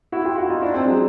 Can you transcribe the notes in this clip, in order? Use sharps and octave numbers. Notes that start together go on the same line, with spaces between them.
E4 F#4
F4 G4
E4 F#4
D#4 F4
D4 E4
C4 D4
F#3 G#3